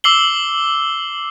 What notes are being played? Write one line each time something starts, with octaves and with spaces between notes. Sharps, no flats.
D6 E6 C7 F#7 G7